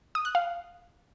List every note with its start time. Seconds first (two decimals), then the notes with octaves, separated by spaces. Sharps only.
0.15 D#6
0.25 F#6
0.35 F5